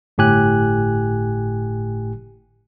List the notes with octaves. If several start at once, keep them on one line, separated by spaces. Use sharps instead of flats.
G1 A2 G4 G#5 F#6